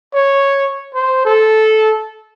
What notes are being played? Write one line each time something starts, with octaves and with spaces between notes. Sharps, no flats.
C#5
C5
A4